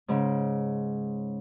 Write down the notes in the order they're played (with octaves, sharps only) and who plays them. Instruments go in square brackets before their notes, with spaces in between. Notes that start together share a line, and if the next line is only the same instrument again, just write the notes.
[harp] G#2 C#3